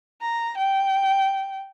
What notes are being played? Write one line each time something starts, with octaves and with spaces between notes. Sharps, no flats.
A#5
G5